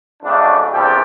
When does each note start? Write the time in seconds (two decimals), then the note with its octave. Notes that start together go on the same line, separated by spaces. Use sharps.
0.23 F2 C#3 F#3 A3 D4
0.71 A#1 E2 C3 G3 G4 A4